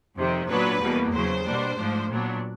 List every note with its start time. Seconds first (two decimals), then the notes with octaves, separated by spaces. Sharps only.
0.17 F2 C3 D#3
0.49 A#2 F#3 B3 D4 B4
0.82 E2 B2 G3 A#3
1.13 E2 C#3 F#3 C5
1.46 B2 G3 A#3 D4
1.79 G#2 F3 A3 D4
2.10 A#2 F#3 B3 D4